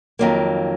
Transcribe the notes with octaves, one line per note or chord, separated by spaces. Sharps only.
F2 D#3 F#3 A#3